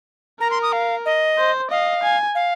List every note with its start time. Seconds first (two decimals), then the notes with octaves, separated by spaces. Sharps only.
0.41 A#4 A#5
0.51 C6
0.62 D#6
0.73 F5
1.06 D#5
1.38 C5
1.71 D#5 F5
2.03 G#5
2.35 F5